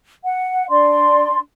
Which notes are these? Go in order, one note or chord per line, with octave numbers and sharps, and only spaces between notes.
F#5
D4 D5 C6